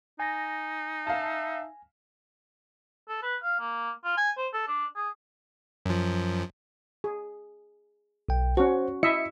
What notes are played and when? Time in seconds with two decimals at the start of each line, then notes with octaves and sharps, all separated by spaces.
0.20 D#4 G#5 A#6
1.07 E5 F5 A5
3.08 A4
3.22 B4
3.43 F5
3.59 A#3
4.04 F4
4.17 G#5
4.37 C5
4.53 A4
4.68 D4
4.96 G#4
5.86 F#2 F3
7.04 G#4
8.29 B1 G5
8.57 C#4 F#4 C5
9.03 E4 D#5 E5 C#7